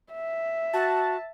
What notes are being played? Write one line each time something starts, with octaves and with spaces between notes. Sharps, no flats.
E5
F#4 A5